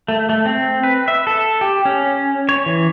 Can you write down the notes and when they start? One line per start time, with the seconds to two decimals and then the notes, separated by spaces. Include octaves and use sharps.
0.08 A3
0.29 A3
0.46 C4
0.83 B4
1.08 E5
1.27 A4
1.61 G4
1.85 C#4
2.49 C#5
2.66 E3